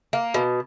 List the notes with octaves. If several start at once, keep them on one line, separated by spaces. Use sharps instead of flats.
A#3
B2